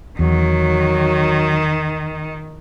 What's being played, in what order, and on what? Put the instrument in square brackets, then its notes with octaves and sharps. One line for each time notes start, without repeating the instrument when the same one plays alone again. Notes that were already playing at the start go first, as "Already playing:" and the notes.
[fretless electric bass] E2 [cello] D#3 [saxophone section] F#3